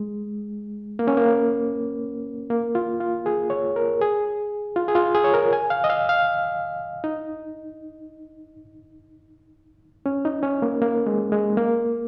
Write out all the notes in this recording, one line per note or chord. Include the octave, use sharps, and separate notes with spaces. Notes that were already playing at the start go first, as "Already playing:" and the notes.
Already playing: G#3
A#3
C#4
A#3
A#3
F4
F4
G#4
C#5
A#4
G#4
F4
G#4
F4
G#4
C#5
A#4
G#5
F5
D#5
F5
F5
D#4
C#4
D#4
C#4
A#3
A#3
G#3
G#3
A#3